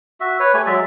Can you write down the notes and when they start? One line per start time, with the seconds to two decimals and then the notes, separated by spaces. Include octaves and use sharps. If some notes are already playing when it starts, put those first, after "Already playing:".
0.20 F#4 E5
0.40 B4 C#5
0.54 A3 G4 G#5
0.66 F#3 G#3 D5 E5